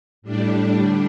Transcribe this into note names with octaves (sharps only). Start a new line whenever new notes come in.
A2 G3 D4
D3 G3 D4